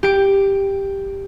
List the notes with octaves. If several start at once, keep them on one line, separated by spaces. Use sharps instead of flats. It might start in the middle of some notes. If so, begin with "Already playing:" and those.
G4 D7